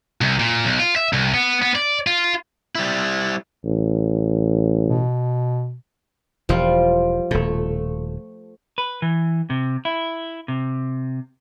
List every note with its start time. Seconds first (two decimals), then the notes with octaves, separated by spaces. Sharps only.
0.21 C2
0.40 A#2
0.65 B1
0.79 F4
0.96 E5
1.13 C2
1.34 B3
1.62 B3
1.75 D5
2.07 F4
2.75 G3 E4
3.65 A1
4.86 B2
6.49 E1 F3 G3 F4
7.31 D#1 B2 A3
8.78 B4
9.02 E3
9.50 C3
9.85 E4
10.48 C3